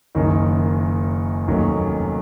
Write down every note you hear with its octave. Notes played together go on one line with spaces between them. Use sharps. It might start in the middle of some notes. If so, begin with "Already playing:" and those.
F#1 F#2 D#3
F1 D#2 D#3 F#3 C#4